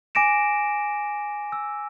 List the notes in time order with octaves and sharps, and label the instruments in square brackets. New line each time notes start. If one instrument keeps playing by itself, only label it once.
[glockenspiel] G#5 D6 A#6 D7 E7
E6